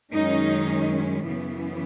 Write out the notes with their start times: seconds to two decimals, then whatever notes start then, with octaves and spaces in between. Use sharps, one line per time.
0.13 F#2 D#3 G#3 C#4 D#4
1.27 F#2 C#3 E3 B3